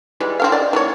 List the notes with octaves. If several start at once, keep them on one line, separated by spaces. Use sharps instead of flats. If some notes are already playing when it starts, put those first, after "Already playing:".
E3 G3 G#3
C4 C#4 F5
D5 D#5
E3 A#3 C#5